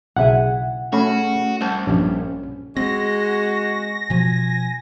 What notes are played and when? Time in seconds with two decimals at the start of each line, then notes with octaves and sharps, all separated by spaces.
0.16 B1 C#3 E4 E5 F#5 G#5
0.93 A3 C#4 F#4 G#4 B5
1.61 C2 D#4 C5 A5
1.87 A#1 G2 C#4
2.77 G#3 C4 F#4 A#6
4.10 B2 F3 G#5